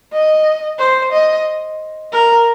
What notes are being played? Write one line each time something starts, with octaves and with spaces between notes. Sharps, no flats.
D#5
C5
D#5
A#4